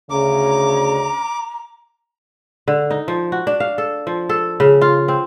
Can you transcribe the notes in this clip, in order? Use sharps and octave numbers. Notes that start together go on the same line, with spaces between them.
D2 C#3 A#5 D6
D3
D#4
F3
F#4
D4
F5
A4
F3
A4
C#3
F4
C4